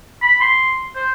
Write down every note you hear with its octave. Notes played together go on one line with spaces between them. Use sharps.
B5
C6
C5